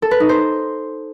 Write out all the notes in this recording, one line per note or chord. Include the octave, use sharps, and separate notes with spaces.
A4
B4
D#4
C5